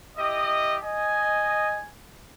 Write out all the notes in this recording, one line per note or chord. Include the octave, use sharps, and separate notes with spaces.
E4 G4 D#5
D#5 G#5